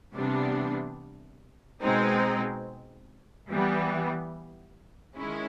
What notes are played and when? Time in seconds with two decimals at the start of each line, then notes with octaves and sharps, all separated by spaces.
0.14 C3 E3 G3 B3 D4
1.82 B2 G#3 C4 D#4
3.49 E3 G3 B3
5.16 D#3 G#3 C#4 E4